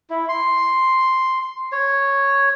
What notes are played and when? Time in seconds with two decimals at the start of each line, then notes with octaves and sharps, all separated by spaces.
0.10 E4
0.29 C6
1.72 C#5